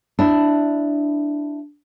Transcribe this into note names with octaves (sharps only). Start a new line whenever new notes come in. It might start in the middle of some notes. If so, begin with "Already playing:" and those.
D4 E4